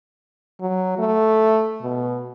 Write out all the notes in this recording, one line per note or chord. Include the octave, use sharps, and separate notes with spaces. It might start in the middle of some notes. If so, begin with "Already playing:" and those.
F#3
A3
B2